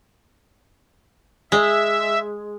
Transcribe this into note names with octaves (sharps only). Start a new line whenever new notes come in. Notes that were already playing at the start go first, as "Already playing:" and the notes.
G#3 E5